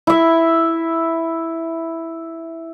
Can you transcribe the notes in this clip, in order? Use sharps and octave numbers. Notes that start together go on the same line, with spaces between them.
E4 E5